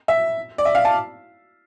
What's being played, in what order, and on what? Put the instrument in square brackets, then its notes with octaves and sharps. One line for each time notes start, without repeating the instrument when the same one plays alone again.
[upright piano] E5
D5
E5
F5
A5